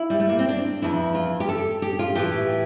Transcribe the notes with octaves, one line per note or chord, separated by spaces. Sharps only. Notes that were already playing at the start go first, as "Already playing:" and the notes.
Already playing: E4
G3
A3
A#3
C4
D4
F2 E3 E4
F4
G4
A4
G4
F4
A2 E3 G4